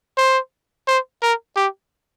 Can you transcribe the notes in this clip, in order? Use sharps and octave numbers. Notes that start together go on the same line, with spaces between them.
C5
C5
A#4
G4